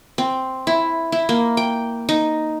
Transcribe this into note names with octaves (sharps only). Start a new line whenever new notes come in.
C4
E4
E4
A#3
G5
D#4